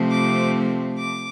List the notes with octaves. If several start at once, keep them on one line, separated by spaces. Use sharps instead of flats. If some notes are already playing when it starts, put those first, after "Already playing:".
Already playing: C3 F3 A3 C4
D6
D6